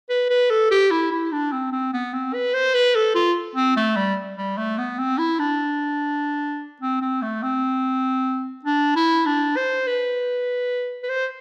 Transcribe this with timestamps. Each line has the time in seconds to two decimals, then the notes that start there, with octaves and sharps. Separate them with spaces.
0.10 B4
0.30 B4
0.50 A4
0.71 G4
0.91 E4
1.11 E4
1.32 D4
1.52 C4
1.72 C4
1.93 B3
2.14 C4
2.34 B4
2.54 C5
2.74 B4
2.95 A4
3.15 F4
3.56 C4
3.77 A3
3.97 G3
4.37 G3
4.57 A3
4.78 B3
4.99 C4
5.18 E4
5.39 D4
6.82 C4
7.02 C4
7.22 A3
7.43 C4
8.65 D4
8.96 E4
9.26 D4
9.56 C5
9.87 B4
11.03 B4
11.09 C5